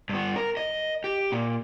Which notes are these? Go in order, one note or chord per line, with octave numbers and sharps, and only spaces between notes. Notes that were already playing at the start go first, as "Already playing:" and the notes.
G2 B3
A#4
D#5
G4
A#2